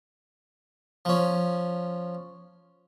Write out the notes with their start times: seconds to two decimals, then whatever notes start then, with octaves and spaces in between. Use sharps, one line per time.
1.05 F3 C#4